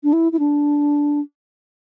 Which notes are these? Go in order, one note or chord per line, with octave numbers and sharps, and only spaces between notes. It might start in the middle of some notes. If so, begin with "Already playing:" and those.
D4
E4
E4
D4